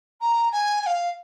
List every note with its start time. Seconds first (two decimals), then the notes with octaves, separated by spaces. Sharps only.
0.21 A#5
0.52 G#5
0.81 G#5
0.86 F5